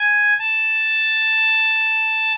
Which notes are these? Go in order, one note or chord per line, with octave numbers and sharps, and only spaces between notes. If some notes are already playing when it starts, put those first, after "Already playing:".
Already playing: G#5
A5